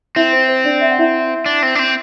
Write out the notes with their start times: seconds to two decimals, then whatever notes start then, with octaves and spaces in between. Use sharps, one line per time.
0.16 C4 E4 E5
0.33 C5
0.49 C5
0.65 D4 D5
0.81 E5
0.90 F#5
0.99 E4 E5
1.46 D4
1.63 C4
1.75 D4
1.79 C4